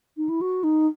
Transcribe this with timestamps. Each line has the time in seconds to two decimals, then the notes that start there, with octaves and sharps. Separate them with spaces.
0.17 D#4
0.29 E4
0.41 F#4
0.64 D#4